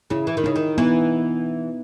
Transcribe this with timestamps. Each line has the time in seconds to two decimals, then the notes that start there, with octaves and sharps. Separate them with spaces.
0.10 C#3 E4
0.27 E3
0.37 D#3
0.44 C#3 D#4
0.56 D#3
0.78 E3 B3